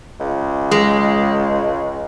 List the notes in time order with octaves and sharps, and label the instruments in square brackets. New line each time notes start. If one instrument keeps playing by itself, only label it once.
[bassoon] C#2
[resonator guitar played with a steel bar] G#3